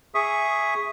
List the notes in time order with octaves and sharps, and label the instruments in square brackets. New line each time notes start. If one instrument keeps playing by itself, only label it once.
[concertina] G#4 E5 C#6 D#6